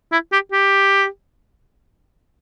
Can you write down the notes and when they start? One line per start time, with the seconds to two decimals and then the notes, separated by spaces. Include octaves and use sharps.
0.12 E4
0.32 G4
0.52 G4